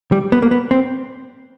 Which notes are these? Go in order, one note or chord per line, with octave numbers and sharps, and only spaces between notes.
G3
B3
A#3
B3
C4